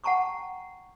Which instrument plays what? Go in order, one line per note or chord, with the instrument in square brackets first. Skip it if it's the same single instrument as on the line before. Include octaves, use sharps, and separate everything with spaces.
[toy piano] F#5 G5 A5 A#5 C#6 D6